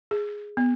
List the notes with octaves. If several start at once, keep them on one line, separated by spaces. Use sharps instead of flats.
G#4
B3